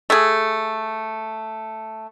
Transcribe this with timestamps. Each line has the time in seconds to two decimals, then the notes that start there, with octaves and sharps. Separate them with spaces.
0.10 A3 G#4